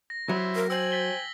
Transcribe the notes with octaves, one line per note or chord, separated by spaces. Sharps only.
A#6
F#3 C5 E5 B5
A#4
C5 G5 G#5 E6 F#7
A6 B6 G7